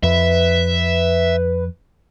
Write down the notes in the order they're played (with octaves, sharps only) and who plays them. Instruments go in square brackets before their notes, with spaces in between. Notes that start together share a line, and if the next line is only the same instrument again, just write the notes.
[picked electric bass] F2 [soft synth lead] B4 [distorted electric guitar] E5